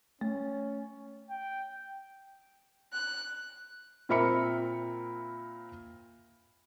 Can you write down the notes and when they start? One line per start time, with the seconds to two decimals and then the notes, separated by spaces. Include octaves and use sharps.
0.21 A3 C#4
1.30 G5
2.93 F#6
4.09 A#2 C4 A#4 E5 B5 C#7